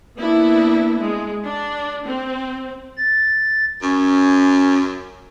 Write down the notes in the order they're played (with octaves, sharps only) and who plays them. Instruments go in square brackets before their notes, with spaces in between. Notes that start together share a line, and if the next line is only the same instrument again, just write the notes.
[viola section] A#3 B3 D4 E4
G#3
D4
C4
[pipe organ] A6
[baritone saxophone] F#2 [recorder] C#4